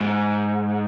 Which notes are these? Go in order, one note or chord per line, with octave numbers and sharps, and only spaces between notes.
G#2